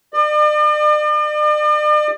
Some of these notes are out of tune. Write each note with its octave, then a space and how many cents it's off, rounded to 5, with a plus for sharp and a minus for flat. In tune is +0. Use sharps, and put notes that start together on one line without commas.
D5 +45